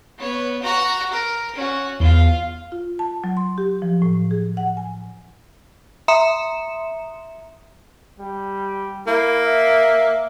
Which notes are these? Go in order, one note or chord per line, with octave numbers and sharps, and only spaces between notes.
B3 C#5
F#4 A#5
A#4
C#4 F#4
E2 F4 F5
F4
A5
F#3
C6
G4
F3
A2
G#4
F#5
G#5
E5 A#5 C6 D#6 C#7 E7
G3
A#3 E4
E5